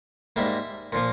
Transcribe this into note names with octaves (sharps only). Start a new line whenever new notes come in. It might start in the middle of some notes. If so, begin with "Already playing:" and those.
G#2 G3 A#3 E5
A#2 F3 A#3